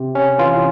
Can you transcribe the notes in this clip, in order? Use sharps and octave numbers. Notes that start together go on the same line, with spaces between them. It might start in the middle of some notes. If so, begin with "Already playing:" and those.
Already playing: C3
C#4
E3 F4